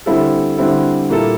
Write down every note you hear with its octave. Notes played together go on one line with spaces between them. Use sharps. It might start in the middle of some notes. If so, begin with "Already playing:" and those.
D3 G3 C4 E4 A4
D3 G3 C4 E4 A4
A#2 G3 A#3 E4 A4